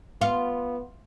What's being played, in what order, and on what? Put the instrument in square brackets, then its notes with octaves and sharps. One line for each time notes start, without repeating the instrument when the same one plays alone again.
[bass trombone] B3 [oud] F4